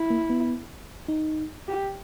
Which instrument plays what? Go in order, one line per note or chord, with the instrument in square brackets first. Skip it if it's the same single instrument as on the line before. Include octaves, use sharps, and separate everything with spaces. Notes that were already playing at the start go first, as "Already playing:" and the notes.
Already playing: [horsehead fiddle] E4
[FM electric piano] A#3
B3
D#4
[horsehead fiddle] G4